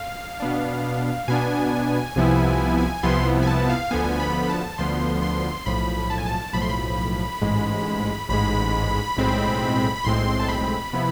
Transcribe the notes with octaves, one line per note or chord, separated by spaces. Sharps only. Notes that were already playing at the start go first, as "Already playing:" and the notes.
Already playing: F5
B2 B3 D4
B2 B3 D4 G#5
C2 C3 F3 B3 E4
C2 C3 F3 B3 E4 C6
G#5
A5
F5
D2 D3 F3 B3 G#5
B5
A5
D2 D3 F3 B3 C6
C6
B1 A2 F3 B5
A5
G#5
A5
B1 A2 F3 B5
C6
B5
A1 G#2 G#3
A1 G#2 G#3 B5
B1 A2 G#3 C4
B5
B1 A2 G#3 C4 C6
A5
B5
C3 F3 B3 E4